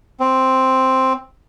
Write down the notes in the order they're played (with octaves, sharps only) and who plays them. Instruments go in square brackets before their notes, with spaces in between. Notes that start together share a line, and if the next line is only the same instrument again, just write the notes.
[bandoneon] C4